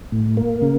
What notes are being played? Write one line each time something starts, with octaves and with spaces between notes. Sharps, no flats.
A2
A#3
C#3